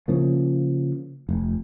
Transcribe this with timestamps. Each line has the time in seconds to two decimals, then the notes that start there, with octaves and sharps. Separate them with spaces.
0.08 C#3 F3 A#3
1.29 F1